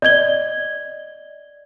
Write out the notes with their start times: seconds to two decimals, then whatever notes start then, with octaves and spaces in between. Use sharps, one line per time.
0.02 D5 D#5 G#6 G7